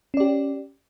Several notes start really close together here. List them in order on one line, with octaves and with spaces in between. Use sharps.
C#4 D5 G4